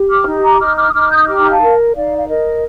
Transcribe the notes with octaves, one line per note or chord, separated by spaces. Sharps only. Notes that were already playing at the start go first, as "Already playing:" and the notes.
Already playing: G4
D6 F6
D#4
A#5 D6
D#4 D6 F6
D6 F6
D#6
D#4 D6 F6
D#6 G6
G6
G4 D6 F6
A#5
F5 A5
A#4
D#4 D5 F5
F5
A#4 D#5